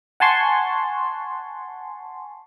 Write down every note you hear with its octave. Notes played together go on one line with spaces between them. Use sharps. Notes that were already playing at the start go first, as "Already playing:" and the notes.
F#5 G#5 A5 C6 C#6